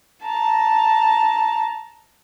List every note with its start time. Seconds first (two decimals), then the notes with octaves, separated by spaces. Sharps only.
0.24 A5 A#5